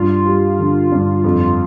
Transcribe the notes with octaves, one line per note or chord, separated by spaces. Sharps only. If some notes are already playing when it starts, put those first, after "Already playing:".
Already playing: G2 F4
G3
D3
G2
F2